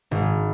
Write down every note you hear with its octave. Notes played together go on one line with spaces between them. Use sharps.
G#1